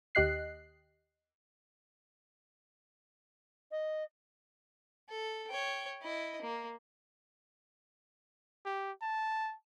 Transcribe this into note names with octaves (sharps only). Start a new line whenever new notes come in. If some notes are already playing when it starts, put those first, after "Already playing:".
D#2 G4 D#5 F#6 C7
D#5
A4
C#5 G5
E4 D#5
A#3
G4
A5